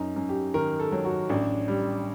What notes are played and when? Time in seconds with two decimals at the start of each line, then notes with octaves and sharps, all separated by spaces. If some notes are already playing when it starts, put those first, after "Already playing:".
Already playing: F#2 D#4
0.16 F#2
0.29 G4
0.54 D#3 A#4
0.80 A4
0.92 F#3
1.05 F#4
1.29 A1 D4
1.68 G3